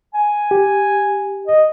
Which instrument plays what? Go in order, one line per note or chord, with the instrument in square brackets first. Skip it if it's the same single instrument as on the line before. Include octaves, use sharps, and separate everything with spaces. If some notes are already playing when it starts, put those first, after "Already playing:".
[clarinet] G#5
[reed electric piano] G4
[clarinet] D#5